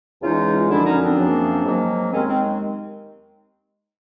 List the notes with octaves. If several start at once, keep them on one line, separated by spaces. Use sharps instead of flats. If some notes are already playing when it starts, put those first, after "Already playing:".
E2 C#3 E3 G#3 D#4 F4
F#2 D3 F3 D4 E4
C#4 D#4
C4 D4
F#2 C#3 F3 A#3
G#2 D#3 F#3 A#3
D#2 D#3 G#3 C4 C#4
C4